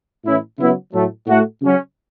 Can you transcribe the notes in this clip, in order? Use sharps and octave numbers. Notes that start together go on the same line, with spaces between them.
A2 E3 C#4 E4
C#3 F#3 B3 E4
A2 F#3 A3
A2 A3 F#4
C#3 F#3 C#4